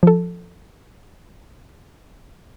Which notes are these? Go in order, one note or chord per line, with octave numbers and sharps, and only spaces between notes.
F3 A4